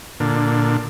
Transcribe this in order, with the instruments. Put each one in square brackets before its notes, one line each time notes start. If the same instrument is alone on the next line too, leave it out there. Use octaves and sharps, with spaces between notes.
[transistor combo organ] A#2 D3